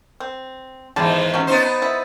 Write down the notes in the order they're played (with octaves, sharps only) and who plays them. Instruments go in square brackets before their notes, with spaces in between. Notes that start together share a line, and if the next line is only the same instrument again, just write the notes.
[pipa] C4
[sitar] E2 G#2 D#3 [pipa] G3 G#4 A5
[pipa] C3 F#3 C#4
[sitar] B3 D#4 C5
[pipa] E4